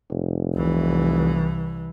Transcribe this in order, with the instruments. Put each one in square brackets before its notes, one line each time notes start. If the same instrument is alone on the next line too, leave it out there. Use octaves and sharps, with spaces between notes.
[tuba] F1
[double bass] C2 E3